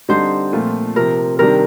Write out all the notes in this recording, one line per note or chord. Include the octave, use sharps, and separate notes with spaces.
D3 G3 C4 D#4 C5
A#2 F3 A3 C4 F4
C3 F3 C4 A#4
C3 D#3 G3 D4 A#4